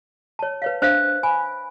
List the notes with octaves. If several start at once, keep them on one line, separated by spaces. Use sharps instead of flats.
C#5 A5
B4 C#5 F5
D4 C5 E5 F5 F#6
G#5 B5